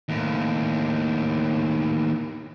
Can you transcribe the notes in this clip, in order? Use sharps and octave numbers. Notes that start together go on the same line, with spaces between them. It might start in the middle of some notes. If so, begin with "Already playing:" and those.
D#2 A2